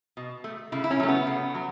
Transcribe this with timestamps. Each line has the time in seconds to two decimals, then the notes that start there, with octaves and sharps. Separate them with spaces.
0.17 B2
0.44 A3
0.72 C#3 E4
0.84 E4
0.91 C#4
0.99 F#3 A3
1.08 B3
1.27 C#3
1.54 F#3